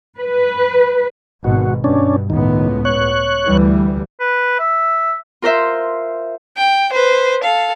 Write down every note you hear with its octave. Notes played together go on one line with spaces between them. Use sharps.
B4
G#1 B2 F#4
G2 B2 C#4 D4
C#2 A2 D#3 B3
C#5 F#6
D2 E3 G3
B4
E5
F4 A#4 C5 E5
G5
B4 C5
A4 F5